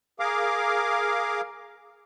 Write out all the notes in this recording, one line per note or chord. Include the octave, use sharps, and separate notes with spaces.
G#4 A#4 F5 D6